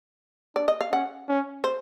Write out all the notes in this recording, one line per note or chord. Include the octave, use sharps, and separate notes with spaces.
D4 D5
D#5
F5
C#4 F#5
C#4
C5